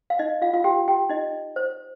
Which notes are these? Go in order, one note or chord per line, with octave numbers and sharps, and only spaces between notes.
F5
D#4 D#5
F4 F5
F4 F5
G4 G5
G4 G5
D#4 D#5
C5